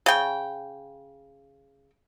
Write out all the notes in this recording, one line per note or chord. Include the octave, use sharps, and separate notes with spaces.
C#3 G5